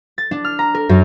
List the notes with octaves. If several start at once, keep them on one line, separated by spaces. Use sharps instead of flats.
A6
D4
F6
A#5
A#4
F#2